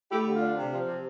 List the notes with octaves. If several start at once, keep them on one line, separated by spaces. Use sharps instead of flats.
A3 E4 G4
D3
F4
D4
C3
F3
C3